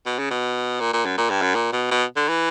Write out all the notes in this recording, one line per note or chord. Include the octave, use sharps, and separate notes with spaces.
B2
C#3
B2
A#2
A#2
F#2
A#2
G2
F#2
A#2
B2
B2
D3
E3